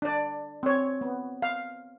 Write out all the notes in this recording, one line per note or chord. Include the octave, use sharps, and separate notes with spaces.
D4 D5
C4 C#5
B3
F5